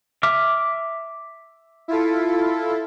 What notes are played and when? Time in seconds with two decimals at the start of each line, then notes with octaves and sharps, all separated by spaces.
0.23 E5 D6 F6
1.88 E4 F4 A4